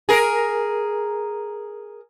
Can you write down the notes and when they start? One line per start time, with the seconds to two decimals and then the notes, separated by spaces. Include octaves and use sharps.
0.09 G#4 A#4